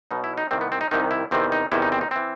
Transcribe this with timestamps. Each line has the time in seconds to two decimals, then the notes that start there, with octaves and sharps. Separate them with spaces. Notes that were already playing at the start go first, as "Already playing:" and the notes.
0.11 B1 B2 D#4
0.24 E4
0.38 D#4
0.51 C2 C3 D#3 C4
0.61 B3
0.72 C4
0.81 D#4
0.91 C2 C3 D#3 D#4
1.11 E4
1.31 E2 C3 D#3 C4
1.52 D#4
1.72 E2 C3 D#3 E4
1.82 D#4
1.92 C4
2.01 D#4
2.11 E3 C4